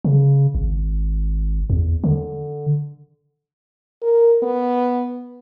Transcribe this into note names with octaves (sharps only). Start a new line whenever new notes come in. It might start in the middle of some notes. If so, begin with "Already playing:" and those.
C#3
G#1
E2
D3
A#4
B3